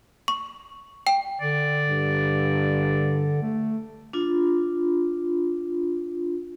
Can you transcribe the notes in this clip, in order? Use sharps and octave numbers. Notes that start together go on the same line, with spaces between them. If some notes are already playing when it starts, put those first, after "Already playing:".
C#6
G5
D3 D5
G2
A3
D4 F4